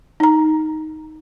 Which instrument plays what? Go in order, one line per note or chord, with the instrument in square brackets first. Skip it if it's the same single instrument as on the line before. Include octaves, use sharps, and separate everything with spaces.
[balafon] D#4 A#5